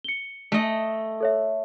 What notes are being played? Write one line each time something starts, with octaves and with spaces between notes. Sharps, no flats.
C#7 G7
A3 D#5
A4 C#5 E5